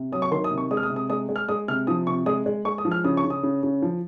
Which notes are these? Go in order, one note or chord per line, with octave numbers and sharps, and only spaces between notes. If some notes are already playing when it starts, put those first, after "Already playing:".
Already playing: C3
F#3 D#6
C#6
D#3 C6
D#6
C3
C#6
G#3 D#6
F6
D#6
C3
D#6
G#3 D#6
G#3
F6
G#3 D#6
C3 F6
F3 D#6
C3 C#6
G#3 D#6
G#3
G#3 C#6
D#6
F3
F6
C#3 D#6
C#6
C#3
D#6
C#3
C#3
F3